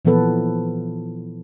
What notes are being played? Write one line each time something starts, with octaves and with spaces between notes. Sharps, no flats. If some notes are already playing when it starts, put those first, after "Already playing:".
A#2 E3 F3 B3 A4 B4